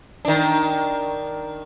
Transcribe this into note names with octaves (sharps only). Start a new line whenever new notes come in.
D#3 D4